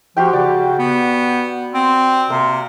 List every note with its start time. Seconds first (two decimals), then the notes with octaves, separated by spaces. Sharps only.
0.17 F3 F#4 G4 G5
0.33 C#3 D5
0.79 B3
1.74 C4
2.30 C3 A#3